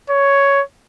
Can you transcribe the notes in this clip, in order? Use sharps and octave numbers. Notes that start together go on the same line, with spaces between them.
C#5